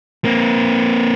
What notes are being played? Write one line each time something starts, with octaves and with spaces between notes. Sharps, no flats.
A#3 C4